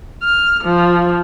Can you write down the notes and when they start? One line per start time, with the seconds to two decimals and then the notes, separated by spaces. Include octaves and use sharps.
0.23 F6
0.63 F3